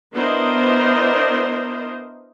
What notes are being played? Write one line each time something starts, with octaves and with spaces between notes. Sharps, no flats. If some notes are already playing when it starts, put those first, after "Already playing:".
B3 D4 E4 A#4 C5 D#5